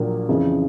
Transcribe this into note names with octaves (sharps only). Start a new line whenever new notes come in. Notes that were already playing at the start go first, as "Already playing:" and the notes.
Already playing: A#1 A#2 F#3 A#3 D4
F2 C#3 E3